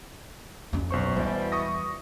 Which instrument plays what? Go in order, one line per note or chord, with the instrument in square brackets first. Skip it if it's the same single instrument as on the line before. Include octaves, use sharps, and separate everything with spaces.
[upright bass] F2 C#4
[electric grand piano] B1 C5 C#6
[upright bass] E2 [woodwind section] B2 E3 G3 [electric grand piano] C5
[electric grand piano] C#6 D#6 A#6